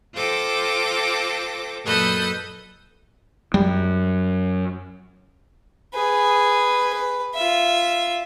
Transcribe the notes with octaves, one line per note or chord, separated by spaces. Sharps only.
F4 A4 C5 G5 D6 A#6
F#2 A#2 A4 B4 D#5 G6
F#2 G3
G#4 B4
B4
F4 E5